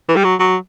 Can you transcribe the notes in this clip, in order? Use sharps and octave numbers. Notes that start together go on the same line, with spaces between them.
E3
G3
F#3
F#3